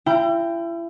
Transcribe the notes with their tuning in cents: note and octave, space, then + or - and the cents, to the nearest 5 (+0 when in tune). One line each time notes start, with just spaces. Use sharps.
E4 +35 G5 +5 A#5 -30